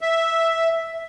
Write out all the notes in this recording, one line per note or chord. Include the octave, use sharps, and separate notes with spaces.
E5